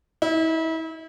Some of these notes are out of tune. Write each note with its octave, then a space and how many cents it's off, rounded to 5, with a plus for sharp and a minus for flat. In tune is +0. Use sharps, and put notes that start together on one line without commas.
E4 -35